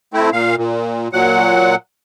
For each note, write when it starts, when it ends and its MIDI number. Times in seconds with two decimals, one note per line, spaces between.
0.14 0.30 57
0.14 0.30 60
0.14 0.30 64
0.33 0.56 46
0.33 0.56 77
0.57 1.08 46
1.13 1.75 46
1.13 1.75 54
1.13 1.75 78